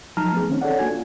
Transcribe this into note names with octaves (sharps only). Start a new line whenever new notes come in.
F3 F#3 D#4 A5 A#5 F6
A3 B3 G#4
D#3 C4 C#4 D#4
A4 C#5 D5 F#5
A#3 D4 F#4 G#5 G#6
F4